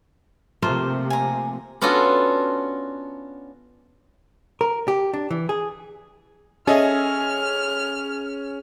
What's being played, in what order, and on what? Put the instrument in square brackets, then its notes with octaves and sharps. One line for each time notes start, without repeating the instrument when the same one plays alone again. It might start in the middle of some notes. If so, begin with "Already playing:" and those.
[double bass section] C3 F3 [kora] A3 A#3 F4 [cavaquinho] C5
[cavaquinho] G#5 A#5
[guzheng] B3 C#4 D4 F4 F#4 A4
[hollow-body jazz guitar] A#4
G4
D4
E3
G#4
[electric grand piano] C#4 [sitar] G#4 [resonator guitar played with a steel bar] A4 D#5 E5 [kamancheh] F6